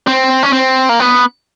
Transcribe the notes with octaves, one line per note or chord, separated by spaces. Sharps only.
C4
C#4
C4
A#3
B3